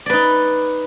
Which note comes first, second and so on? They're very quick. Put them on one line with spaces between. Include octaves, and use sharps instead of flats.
D5 B4 D#4